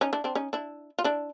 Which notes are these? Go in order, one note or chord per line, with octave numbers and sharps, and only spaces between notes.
C#4 D#4
D4 E4
C4 D4
C#4 D#4
D4 E4
F4
D4 E4